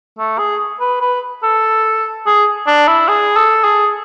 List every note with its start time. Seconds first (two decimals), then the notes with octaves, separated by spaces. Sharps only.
0.18 A3
0.38 G#4
0.80 B4
1.01 B4
1.43 A4
2.26 G#4
2.67 D4
2.87 E4
3.08 G#4
3.37 A4
3.64 G#4